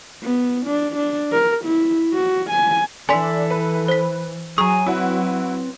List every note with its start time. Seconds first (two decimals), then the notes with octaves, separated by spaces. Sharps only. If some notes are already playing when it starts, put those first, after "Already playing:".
0.23 B3
0.66 D4
0.96 D4
1.33 A#4
1.65 E4
2.13 F#4
2.50 G#5
3.09 E3 D4 A4 E5 G#5 C6 B6
3.50 B4
3.88 C5 B6
4.58 F#3 G#4 G#5 A#5 C#6 D#6
4.87 C4 E4 F#4 B4